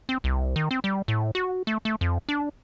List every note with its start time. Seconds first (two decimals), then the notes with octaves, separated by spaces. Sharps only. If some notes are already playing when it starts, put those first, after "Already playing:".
0.09 C4
0.24 C2
0.56 D#3
0.71 C4
0.84 G3
1.08 A2
1.35 F#4
1.67 A3
1.85 A3
2.01 F2
2.29 D4